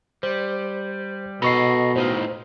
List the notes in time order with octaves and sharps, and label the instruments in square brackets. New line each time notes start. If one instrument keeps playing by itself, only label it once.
[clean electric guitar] G3 [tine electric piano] C5
[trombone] B2 [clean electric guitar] A4 D#5 A#5 [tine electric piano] B5 C#6 C7
[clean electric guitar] A2 D#4 F4 [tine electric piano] C5